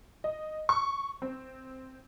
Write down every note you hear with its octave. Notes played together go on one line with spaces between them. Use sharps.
D#5
C#6
C4